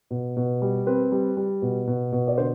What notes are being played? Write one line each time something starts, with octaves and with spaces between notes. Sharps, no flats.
B2
B2
G3
C4 B4
G3
G3
B2
B2
B2
D5
D3 C5